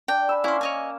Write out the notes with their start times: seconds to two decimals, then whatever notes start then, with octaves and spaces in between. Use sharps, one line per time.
0.08 D4 G5
0.29 G#5 B5 E6
0.44 A#3 C#4 E4 A#4 C6
0.61 C#5 D#5 G#5